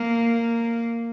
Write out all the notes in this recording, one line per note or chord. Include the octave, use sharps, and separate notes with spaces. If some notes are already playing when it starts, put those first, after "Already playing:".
Already playing: A#3